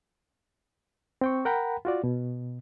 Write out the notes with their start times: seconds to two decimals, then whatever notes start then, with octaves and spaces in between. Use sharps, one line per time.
1.21 C4 G5 C#6
1.45 A#4 F#5 G5 A#5 B5
1.85 F4 F#4 D5
2.04 B2